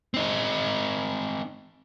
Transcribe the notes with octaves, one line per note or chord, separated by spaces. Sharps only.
C4 D#4